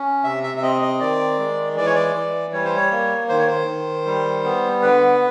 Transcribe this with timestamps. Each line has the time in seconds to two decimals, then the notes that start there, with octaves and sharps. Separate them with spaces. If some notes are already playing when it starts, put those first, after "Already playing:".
Already playing: C#4
0.24 C3 E5
0.43 E5
0.58 E5
0.62 C4 D#5
0.82 D#5
1.00 D#3 D5
1.39 G#3
1.76 E3 D5
1.86 C#5
1.95 D5
2.14 E3
2.53 G3 C#5
2.65 C5
2.77 C#5
2.92 A#3
3.29 D#3 C5
3.39 C#5
3.47 C5
3.68 D#3
4.06 G3
4.44 B3
4.82 D3 B4